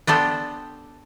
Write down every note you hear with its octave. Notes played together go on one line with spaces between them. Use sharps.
B3 D4 G4 A4 C5 G5